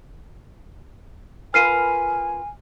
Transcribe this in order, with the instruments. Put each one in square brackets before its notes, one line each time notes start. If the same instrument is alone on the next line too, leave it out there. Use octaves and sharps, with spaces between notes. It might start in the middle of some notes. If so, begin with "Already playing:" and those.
[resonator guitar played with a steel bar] F4 A#4 B4 [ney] G#5 [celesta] F6 C7 D#7